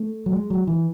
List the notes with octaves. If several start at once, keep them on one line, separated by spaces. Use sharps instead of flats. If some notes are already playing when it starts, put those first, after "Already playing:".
Already playing: A3
F#3
G#3
F#3
E3